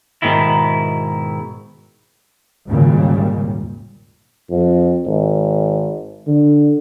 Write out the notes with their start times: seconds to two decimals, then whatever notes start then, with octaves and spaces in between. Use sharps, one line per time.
0.22 G#2 B2 D#3 E4
2.67 G#1 D#2 A#2 C#3 G3
4.50 F2
5.06 G#1
6.27 D3